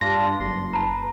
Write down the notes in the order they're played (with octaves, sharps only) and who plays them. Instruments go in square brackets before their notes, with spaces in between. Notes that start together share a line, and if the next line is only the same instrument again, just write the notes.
[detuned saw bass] G2 [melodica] D4 F4 [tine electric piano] A#6
[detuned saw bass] F#1 [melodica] C6
[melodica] B4 [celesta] A5 A#5